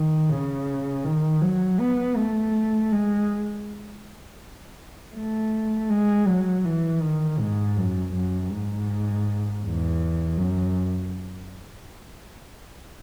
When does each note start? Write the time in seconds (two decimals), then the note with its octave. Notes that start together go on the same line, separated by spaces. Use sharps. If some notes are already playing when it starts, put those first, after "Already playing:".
Already playing: D#3
0.30 C#3
1.04 D#3
1.41 F#3
1.79 B3
2.16 A3
2.92 G#3
5.15 A3
5.89 G#3
6.27 F#3
6.65 E3
7.01 D#3
7.39 G#2
7.76 F#2
8.14 F#2
8.52 G#2
9.64 E2
10.38 F#2